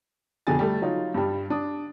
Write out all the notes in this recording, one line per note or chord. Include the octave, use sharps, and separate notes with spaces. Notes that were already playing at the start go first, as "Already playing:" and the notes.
F2 B2 D3 G#4 G#5 A6
G3 A3
F#3 D#4 F4
G2 G3
D4 D#6